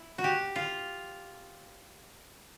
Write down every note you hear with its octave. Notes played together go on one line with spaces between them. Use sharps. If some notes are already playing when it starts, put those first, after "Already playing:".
Already playing: E4
F#4
G4
F4